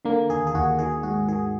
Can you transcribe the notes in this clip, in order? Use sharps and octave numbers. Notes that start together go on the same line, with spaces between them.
D3 A#3
D#2 G#4
G#4
D#2 F#4
D#3 G#4
G#2 F#4
D#3 G#4